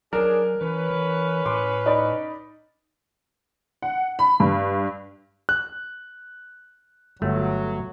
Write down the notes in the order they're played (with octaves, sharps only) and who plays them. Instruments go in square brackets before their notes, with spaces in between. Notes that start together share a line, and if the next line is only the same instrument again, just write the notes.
[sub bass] F#3 [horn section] C#4 D4 G#4 [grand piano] A#4
[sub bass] E3 [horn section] C#4 B4
[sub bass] E3
[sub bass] A2 [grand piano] C6 D6
[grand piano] D#4 D5 B5
[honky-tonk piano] F#5
B5
G2
[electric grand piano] F#6
[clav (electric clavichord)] G1 A3 [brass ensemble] F#3